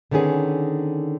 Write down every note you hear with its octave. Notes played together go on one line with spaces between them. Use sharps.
D3 D#3 B3 C#4 G#4